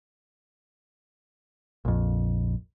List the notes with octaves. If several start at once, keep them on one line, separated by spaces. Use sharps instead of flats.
A#1 F2